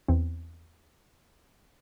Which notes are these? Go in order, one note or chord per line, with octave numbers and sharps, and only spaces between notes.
E2 C4